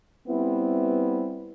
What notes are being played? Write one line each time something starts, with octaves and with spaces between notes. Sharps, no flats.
G3 B3 C4 E4